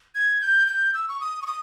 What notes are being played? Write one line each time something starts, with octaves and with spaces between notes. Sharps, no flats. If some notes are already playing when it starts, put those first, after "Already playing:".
G#6
G6
G6
E6
C#6
D#6
C#6
D#6